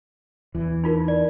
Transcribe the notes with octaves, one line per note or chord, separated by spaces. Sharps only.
E2 E3
D#4 F4 A#4
D5